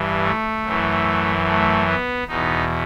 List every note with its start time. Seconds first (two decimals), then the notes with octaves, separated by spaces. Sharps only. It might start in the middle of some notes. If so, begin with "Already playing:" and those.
Already playing: G2 E3
0.22 A3
0.64 F#2 E3
1.46 A3
1.87 B3
2.28 E2 B2 D#4